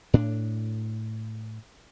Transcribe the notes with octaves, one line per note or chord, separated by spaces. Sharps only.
A2 D4